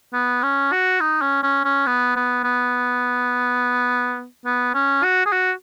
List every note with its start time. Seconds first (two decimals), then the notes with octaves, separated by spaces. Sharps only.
0.14 B3
0.43 C#4
0.72 F#4
1.00 D#4
1.22 C#4
1.43 C#4
1.65 C#4
1.86 B3
2.16 B3
2.44 B3
4.45 B3
4.75 C#4
5.03 F#4
5.26 G#4
5.32 F#4